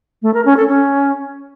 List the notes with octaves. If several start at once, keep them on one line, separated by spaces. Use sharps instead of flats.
A3
A#4
C#4
A4
C#4